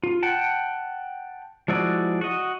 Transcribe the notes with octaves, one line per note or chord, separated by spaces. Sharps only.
F4
F#5 G5 A5
F3 G#3 E4 F#4 D5
F#4 D#5